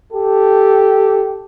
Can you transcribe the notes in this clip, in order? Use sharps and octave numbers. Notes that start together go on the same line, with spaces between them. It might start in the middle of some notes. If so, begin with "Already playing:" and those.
G4 A4